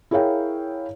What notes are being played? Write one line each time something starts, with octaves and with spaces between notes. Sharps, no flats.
E4 G#4 A#4 C#5 F5 G5